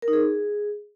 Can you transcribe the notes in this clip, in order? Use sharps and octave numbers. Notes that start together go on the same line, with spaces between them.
A#4
D#4
G#4